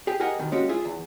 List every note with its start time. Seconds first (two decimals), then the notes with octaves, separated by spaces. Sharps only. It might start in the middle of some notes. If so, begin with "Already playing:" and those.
0.07 G4 G#4
0.20 G4 G#4 A#4 D#5 F#5 G#5
0.39 B2 D#3
0.52 G#3 A#3 C#4 F#4 G4
0.69 F4 G#4 E5
0.85 E2